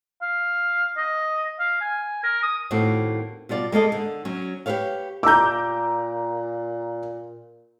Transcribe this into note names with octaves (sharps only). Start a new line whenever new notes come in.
F5
D#5
F5
G#5
A#4
D#6
D#2 A2 A#3 C4 F#4
B2 G3 F4 D5
G#3 A#3 A4 D#5
D3
F#3 C#4
G4 A4 B4 C#5 F5
A#2 A#5 D6 E6 G6